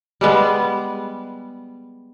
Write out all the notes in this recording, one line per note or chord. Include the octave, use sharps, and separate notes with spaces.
G3 G#3 B3